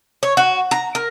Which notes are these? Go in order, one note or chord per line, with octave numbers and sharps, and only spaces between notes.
C#5
F#4
A#5
A#4